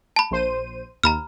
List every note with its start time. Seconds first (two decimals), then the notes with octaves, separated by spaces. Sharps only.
0.16 A5 B5
0.31 A#1 C5 D#7
1.04 D#2 A#5 B5 F6